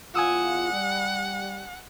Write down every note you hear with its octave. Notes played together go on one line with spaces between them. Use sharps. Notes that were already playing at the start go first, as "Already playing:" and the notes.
E2 F4 F#5 G#5 D#6 E6
G3